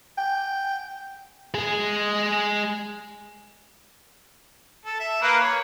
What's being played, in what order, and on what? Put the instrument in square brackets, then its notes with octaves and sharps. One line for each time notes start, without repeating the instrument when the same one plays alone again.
[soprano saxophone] G5
[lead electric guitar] G#3 G#4
[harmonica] A4
E5
A#3 A#4 B4
C#5